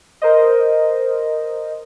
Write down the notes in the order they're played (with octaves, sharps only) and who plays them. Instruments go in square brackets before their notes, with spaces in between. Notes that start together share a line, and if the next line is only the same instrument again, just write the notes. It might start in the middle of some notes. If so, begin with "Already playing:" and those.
[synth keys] A#4 C5 D#5